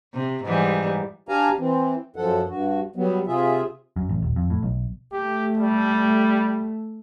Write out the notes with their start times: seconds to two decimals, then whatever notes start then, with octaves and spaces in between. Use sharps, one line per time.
0.14 C3
0.44 G#2 E3 G3
1.29 D4 G4 F5 G#5 A#5
1.59 E3 C4
2.16 F#2 F3 A4 F#5
2.49 G2 F#4
2.96 F#3 G3 B3
3.27 C3 F4 G#4 E5
3.96 F#2
4.09 A1
4.22 D#1
4.36 F2
4.50 A2
4.63 B1
5.13 A3 G4
5.58 G3